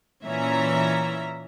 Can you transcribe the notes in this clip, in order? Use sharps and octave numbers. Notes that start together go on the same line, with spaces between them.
A#2 E3 C#4 E5 A#5